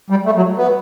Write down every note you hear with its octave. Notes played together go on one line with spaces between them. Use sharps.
G3
A3
F#3
B3